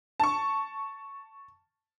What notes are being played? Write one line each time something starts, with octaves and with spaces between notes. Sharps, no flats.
A5 C#6